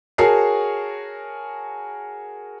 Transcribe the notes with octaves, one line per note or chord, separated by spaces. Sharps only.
F#4 G#4 A#4 C#5 A5 C7